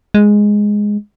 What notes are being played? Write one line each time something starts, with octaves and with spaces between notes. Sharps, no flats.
G#3